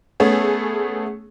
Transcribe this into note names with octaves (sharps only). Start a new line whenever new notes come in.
A3 B3 C#4 G#4